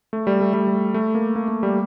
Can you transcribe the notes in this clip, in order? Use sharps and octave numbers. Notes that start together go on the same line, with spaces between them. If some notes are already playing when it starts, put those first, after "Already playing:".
A3
G3
A3
G3
A3
A3
A#3
A#3
A3
G3